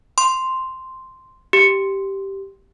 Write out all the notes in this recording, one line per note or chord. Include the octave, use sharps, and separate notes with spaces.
C6
G4